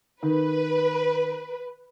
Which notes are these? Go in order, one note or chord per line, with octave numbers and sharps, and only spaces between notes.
D#3 B4